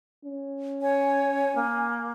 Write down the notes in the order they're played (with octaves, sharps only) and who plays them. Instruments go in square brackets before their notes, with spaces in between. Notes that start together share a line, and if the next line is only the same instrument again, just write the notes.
[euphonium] C#4
[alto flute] C#5 [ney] G#5
[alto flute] A#3